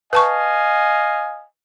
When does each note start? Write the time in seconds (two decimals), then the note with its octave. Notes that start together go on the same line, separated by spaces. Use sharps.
0.13 B4 D#5 F5 G#5 A5 C#6